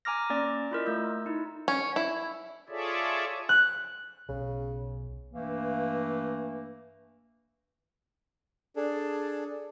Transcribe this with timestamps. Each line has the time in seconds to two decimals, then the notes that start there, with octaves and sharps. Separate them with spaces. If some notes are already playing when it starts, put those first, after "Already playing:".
0.05 G#5 A#5 D6 F6 A#6
0.30 A#3 C#4 D5 D6
0.71 E4 F4 A#4 D#5
0.86 A3 E6 G6
1.26 D#4 E4
1.68 C#4
1.96 E4
2.69 F4 G#4 A4 C#5 D5 E5
3.49 F#6
4.29 B1 C#3
5.32 G2 E3 A3 A#3
8.76 D4 G#4 A4